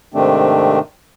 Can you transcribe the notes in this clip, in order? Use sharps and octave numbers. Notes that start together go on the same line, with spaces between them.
G#2 C3 D#3 A3 C4 D4